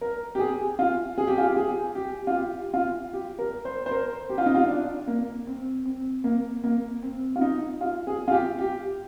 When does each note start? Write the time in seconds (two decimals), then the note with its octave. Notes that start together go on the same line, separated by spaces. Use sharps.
0.01 A#4
0.35 G4
0.39 G#4
0.79 F4
1.18 G#4
1.27 G4
1.38 F4
1.47 G4
1.56 G#4
1.95 G4
2.27 F4
2.35 G4
2.74 F4
3.13 G4
3.39 A#4
3.65 C5
3.86 C5
3.91 A#4
4.29 G4
4.38 F4
4.46 D#4
4.55 F4
4.68 D4
5.07 A#3
5.47 C4
5.85 C4
6.24 A#3
6.64 A#3
7.02 C4
7.36 F4
7.41 D#4
7.81 F4
8.07 G#4
8.28 F4
8.32 G4
8.58 G4